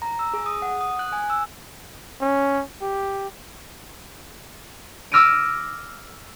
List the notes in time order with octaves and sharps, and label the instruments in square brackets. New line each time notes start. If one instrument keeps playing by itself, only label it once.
[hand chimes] A#5
E6
G#4
D#6
F#5
D#6
F#6
G#5
E6
[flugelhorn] C#4
G4
[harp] D6 E6 F6 A#6 D7 D#7